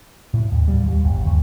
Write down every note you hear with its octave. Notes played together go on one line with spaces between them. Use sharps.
A2
D#2
G3
D#2
G1
D#2